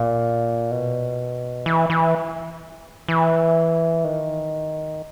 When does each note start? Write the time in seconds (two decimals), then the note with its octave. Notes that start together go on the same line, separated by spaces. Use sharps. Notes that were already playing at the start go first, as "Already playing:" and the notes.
Already playing: A#2
0.71 B2
1.66 E3
1.90 E3
3.09 E3
4.04 D#3